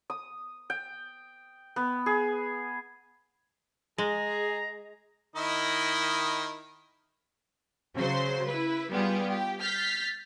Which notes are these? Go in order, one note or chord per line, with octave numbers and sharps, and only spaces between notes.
D#6
G5
B3
G#4
G#3 G#4 A#5
D#3 E4 D#5
C#3 F#3 C5 C6
E4 B4
G3 B3 F4 G4 G#4
G4
F6 G6 A6 B6 C7